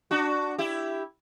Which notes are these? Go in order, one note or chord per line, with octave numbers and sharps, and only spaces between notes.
D4 F#4
E4 G4